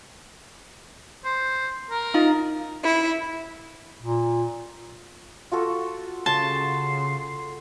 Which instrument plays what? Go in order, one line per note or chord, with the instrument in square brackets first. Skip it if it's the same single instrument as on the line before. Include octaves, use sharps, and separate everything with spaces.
[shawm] C5
A#4
[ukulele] D#4 F4
[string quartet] E4
[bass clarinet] A#2
[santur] F4 F#4 A4
[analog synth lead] C#3 [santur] F#5 [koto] A5 [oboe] C6